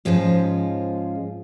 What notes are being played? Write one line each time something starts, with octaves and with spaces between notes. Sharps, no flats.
G#2 F3 G#3 C#4 F4